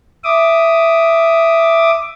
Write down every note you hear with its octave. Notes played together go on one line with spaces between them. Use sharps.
E5 D6 D#6